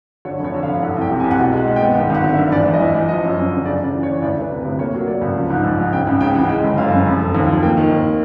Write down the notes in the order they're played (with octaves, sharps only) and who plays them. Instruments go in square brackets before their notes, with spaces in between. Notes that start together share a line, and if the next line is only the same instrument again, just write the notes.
[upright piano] D3 C#5
F1
C#5
D3
F5
F1
C2 F#5
C2
G5
C3
G#5
C2
F#5
B2 G5
G#3 F#5
G#3
G5
B3
G#1 F#5
G#1 F#5
D3
E5
G2
E2 D5
E2
D#5
E2 E5
E2
F3 D#5
F#2
F#2
D3
C#3 D5
C#3 D5
E3
C#5
E3
D2 D5
D2 B4
C3
B4
D2
A#3 C#5
F#3
A#3 D5
C#2
F3
G#2
A#1
G#2
C#3 G5
C#2
C#3 G5
E3 F#5
G#3 G5
G1
F#2 F5
F#2
F1
F1
D#2
F3
A#3 G5
D#3
D#2